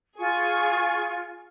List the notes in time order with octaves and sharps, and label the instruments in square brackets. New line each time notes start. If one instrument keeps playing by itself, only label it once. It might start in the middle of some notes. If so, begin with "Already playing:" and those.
[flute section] F4 [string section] G#4 G#5 C#6